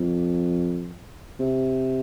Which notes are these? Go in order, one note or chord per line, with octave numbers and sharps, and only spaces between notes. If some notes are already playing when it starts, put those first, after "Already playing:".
Already playing: F2
C3